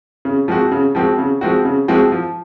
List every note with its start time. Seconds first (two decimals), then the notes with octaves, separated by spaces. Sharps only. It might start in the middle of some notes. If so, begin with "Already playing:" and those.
0.25 C#3
0.48 F3 G#3 C4 F#4
0.72 C#3
0.95 F3 G#3 C4 F#4
1.18 C#3
1.41 F3 G#3 C4 F#4
1.65 C#3
1.88 F3 G#3 C4 F#4
2.12 F3